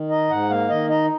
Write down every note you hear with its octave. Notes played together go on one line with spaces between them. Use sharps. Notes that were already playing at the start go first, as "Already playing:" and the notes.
Already playing: D#3
D#4 D#5
G#2 F#5
A#3 F5
D#3 D#5
D#4 D#5